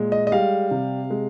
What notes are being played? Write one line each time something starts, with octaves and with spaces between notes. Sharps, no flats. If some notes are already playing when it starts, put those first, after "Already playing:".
Already playing: A#2 G#3
D#5
D#5
G3 F5
C3
G#3